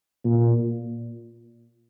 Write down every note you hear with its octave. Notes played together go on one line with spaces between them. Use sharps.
A#2